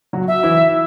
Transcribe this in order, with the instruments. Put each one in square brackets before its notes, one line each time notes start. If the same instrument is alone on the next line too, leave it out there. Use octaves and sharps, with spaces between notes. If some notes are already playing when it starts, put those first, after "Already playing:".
[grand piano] F#3 F#4
[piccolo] E5
[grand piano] E3 E4